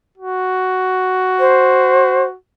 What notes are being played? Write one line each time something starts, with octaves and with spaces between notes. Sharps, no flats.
F#4
C5